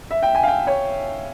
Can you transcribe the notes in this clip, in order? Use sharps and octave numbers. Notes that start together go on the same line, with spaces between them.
E5
G5
G#5
F5
G5
C#5